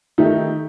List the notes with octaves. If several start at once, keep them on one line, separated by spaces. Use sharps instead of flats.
D#3 A3 D#4 G4